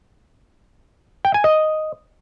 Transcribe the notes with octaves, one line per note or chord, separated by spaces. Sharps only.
G5
G#5
D#5